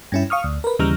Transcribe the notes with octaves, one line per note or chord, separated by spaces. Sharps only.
G2 C#4 E4
F5 C#6 D#6 F6
D2
A#4 B4
D#2 C#3 E3 G3 A#5 F6